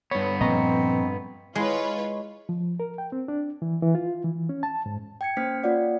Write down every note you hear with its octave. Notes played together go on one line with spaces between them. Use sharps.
G2 B3 C#5
A#2 F3 A#3 C4 D#5 A#5 C#6
G#3 E4 F4 B4 C#5
F3
A#4
G5
C4
D4
E3
E3
F4
E3
C#4
A5
G#2
G5 G#6 C#7
A#3 C#4 C5 F6 B6
A#3 F4 C#5 D5 F#5